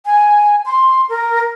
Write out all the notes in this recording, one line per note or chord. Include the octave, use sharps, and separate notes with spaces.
G#5
C6
A#4